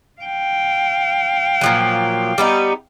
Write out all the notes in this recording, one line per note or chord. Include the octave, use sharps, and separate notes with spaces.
F5 G5
A#2 F3 F#3
G3 B3 D#4